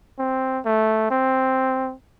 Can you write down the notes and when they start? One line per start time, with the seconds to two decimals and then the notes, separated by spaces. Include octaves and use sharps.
0.18 C4
0.65 A3
1.11 C4